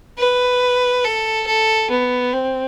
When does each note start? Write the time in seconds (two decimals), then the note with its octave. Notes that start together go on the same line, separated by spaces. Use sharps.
0.18 B4
1.04 A4
1.47 A4
1.90 B3
2.33 C4